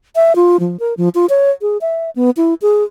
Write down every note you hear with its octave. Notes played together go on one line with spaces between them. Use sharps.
E5
F4
F3
A#4
F3
F4
C#5
G#4
E5
B3
E4
G#4